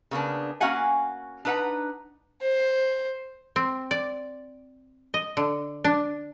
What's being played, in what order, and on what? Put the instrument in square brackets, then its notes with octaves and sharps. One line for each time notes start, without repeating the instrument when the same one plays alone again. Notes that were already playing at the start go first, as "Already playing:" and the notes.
[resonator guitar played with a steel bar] C#3 A#3 B3 D4
A#3 C#4 F#4 F5 F#5 G#5
D4 D#4 B4 E5 F#5 A#5
[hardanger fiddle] C5
[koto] C4
D5
D#5
D3
D4